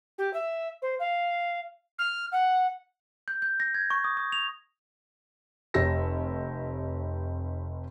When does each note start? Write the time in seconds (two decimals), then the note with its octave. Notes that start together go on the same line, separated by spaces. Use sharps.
0.18 G4
0.34 E5
0.82 C5
0.99 F5
1.99 F6
2.32 F#5
3.28 G6
3.42 G6
3.60 A#6
3.74 G#6
3.90 C#6
4.04 D#6
4.17 D#6
4.32 F7
5.74 F1 G4 C#5 E6 A#6